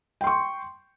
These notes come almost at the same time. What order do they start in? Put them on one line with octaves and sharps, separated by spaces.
G5 C6 C#6